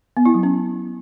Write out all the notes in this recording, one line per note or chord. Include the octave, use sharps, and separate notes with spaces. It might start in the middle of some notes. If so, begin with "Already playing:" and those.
B3
E4
F#3
C#4